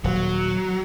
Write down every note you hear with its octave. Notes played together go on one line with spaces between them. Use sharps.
D#1 F#3